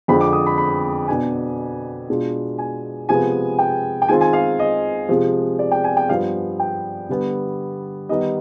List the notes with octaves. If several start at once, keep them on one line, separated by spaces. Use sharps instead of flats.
F2 D3 F3 G#3 B5
D6
D#6
B5
B5
B2 B3 D4 G#5
B2 G#3 D4 F4
G#5
C3 F3 G#3 B3 G#5
G5
G5
D#3 G#3 C4 F4 G#5
G#5
F5
D#5
C3 F3 G#3
D5
G5
G#5
G5
G2 F3 B3 F5
G5
D3 G3 B3
D#3 G3 B3 D#4 D#5